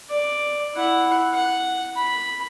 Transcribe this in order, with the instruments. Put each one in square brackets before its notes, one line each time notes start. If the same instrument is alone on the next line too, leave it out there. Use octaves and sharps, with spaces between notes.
[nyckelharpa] D5
E4 F#5
F#5
B5